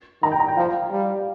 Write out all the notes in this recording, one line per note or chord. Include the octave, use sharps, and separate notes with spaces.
D#3 A#5
G5
A#5
G5
F3 F5
G3